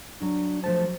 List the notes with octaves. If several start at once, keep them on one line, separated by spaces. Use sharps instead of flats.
F#3 D4
F3 A3 C5 A5